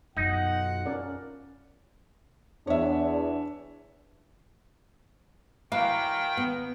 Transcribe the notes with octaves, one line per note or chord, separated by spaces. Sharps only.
B1 F#2 D#4 F4 F#5
C#4 A#4 D5
E2 D4 C#5 E5
D#3 E3 F#3 A#3 F5 G5
B3